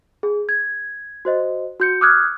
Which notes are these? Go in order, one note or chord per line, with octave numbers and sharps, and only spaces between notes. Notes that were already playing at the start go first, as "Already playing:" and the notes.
G#4
G#6
F#4 C5 D#5
F#4 G6 C#7
D6 D#6 F6 F#6 G#6